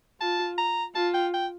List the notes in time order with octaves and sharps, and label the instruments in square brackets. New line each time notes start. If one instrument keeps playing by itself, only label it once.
[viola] F4 [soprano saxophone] A5
[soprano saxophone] A#5
[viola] F4 [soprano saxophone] A5
[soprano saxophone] G5
G5